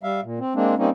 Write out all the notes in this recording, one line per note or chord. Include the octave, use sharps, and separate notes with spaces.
G3 E5 F5
A#2
C4
G#3 A#3 C4 D4
G3 A#3 C4 C#4 D#4